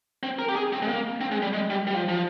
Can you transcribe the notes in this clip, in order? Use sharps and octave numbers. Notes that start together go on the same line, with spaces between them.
C4
A#4
G4
G#4
C4
G#3
A#3
C4
G#3
G3
G#3
G3
G3
F3
F3